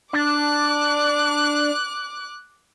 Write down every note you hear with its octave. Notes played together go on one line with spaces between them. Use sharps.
D4 D6 F#6